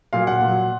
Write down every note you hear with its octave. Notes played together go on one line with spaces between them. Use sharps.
A#2 F#3 F5
F#5
A#2 F#3